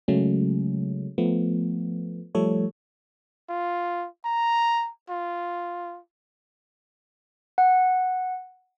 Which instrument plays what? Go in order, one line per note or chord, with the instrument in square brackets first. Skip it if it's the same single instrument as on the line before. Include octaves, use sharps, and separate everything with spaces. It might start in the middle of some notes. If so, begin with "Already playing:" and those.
[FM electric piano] C#3 F#3 G#3 A3 C#4
F3 A3 B3
F3 G3 A3 A4 C#5
[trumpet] F4
A#5
F4
[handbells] F#5